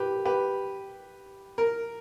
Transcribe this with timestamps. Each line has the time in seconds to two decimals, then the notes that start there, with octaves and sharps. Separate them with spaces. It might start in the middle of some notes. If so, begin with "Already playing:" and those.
Already playing: G4 B4
0.25 G4 B4
1.58 A#4